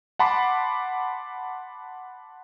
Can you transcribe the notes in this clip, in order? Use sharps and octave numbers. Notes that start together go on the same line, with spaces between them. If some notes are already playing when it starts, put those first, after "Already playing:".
F#5 A5 B5 C6 D6